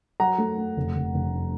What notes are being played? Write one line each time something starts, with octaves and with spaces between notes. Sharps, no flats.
F#3 F#5 A#5
A3
A3
F1
F1
F1